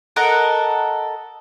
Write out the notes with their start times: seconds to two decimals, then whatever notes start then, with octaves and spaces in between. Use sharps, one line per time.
0.16 A4 A#4 D#5 F#5